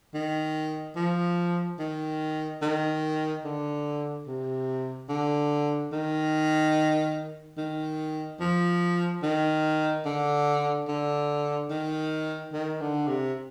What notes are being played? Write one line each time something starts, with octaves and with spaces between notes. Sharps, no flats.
D#3
F3
D#3
D#3
D3
C3
D3
D#3
D#3
F3
D#3
D3
D3
D#3
D#3
D3
C3